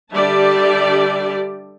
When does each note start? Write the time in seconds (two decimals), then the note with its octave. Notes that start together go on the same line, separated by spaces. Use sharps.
0.13 D3 G3 G4 D5 E5 A5